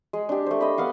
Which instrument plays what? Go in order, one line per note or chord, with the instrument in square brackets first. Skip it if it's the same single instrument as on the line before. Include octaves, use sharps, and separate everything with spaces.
[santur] G#3
D4 G4
A3 C5
D#5 B5
B3 B4 F5 F#5